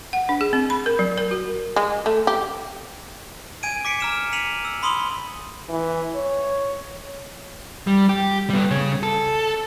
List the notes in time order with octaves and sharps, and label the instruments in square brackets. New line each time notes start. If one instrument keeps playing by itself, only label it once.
[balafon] F#5
D4
G#4
C4
B5
A#4
F#3
A#4
F#4
[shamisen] G#3
A3
G4
[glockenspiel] G#5 G#6 D7 D#7
D6 B6 C#7 D7
A#5 F6 E7
B6 C#7 D#7 F7 F#7
E6
B5 C6 D#6 F#7 G7
[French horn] E3
C#5
[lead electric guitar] G3
G4
G3 B3
C#3 C#4
A4